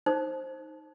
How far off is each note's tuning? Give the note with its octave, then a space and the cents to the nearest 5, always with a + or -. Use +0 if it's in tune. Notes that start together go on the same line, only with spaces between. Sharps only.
D#4 +0 C5 +15